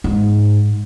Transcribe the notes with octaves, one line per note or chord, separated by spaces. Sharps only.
G#2